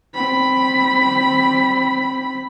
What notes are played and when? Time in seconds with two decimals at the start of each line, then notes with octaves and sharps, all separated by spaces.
0.14 C4 B5